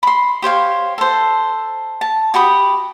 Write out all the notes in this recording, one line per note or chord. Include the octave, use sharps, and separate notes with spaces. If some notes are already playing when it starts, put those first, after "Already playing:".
B5 C6
G4 C5 C#5 F5
A4 C5
A5
F#4 G4 B5 D#6